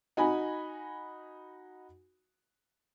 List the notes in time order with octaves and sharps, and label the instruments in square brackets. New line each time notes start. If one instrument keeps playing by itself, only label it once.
[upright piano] D#4 F#4 G#5 B5